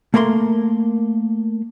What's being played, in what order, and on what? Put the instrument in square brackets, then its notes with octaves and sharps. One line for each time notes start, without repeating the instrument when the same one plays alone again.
[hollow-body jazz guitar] A3 A#3 A#4 B5 C6